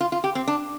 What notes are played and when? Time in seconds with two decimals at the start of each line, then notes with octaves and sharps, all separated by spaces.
0.01 F4
0.12 F4
0.24 G4
0.35 C4
0.48 D4